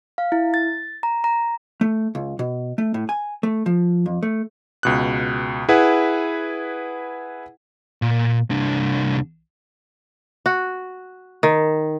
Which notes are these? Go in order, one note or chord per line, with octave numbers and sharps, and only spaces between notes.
F5
E4
A6
A#5
A#5
A3
C#2
B2
A3
A2
G#5
A3
F3
F2
A3
C#2 B2 F#6
E4 G#4 B4 F#5
A#2
C2 D4
F#4
D#3